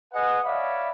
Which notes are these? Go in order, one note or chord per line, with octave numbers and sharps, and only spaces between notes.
G#4 B4 D#5 F#5
C#5 D5 E5 F5 B5